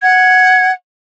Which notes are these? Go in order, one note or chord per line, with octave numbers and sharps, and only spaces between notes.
F#5 G#6